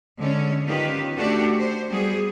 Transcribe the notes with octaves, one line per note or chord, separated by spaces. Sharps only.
D3 G#3 C#4
D#3 B3 C#4 F4 G4 B4
A3 D4 F#4 G4 A4
C5
G3 B3 F#4 G#4